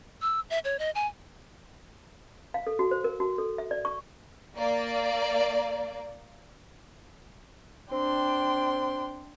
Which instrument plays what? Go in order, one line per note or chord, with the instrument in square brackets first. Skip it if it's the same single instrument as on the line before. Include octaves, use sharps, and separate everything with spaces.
[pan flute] E6
E5
C#5
D#5
G#5
[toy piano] F5
A4
F#4
C5
A#4
F#4
A4
E5
D5
C#6
[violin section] A#3 D5
[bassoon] C4 [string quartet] D4 G5 C6